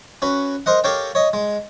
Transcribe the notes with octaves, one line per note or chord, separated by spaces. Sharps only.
C#4 F#4 B4
A#4 C5 D#5 F#5
G4 A4 A#4 C#5 F5 G5
C#5 D#5
G#3